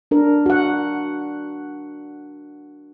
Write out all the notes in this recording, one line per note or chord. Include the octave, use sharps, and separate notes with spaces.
D4 A#4
F#4 F#5